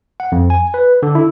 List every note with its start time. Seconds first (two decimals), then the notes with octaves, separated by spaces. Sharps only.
0.20 F#5
0.32 F2
0.50 G#5
0.74 B4
1.03 D3
1.15 E4